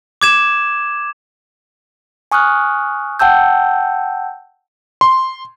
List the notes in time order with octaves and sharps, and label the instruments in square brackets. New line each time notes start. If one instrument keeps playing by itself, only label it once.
[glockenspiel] D6 G#6 E7
[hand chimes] G#5 C#6 D#6 F6 F#6
F#5 G5 A5 E6 G6
[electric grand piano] C6